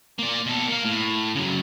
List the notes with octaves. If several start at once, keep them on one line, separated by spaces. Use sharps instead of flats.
A#3 D5
B2 A4
A#3 F5
A2
C#3 F#3